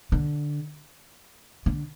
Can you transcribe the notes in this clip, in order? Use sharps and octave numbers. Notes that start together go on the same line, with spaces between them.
D3
D3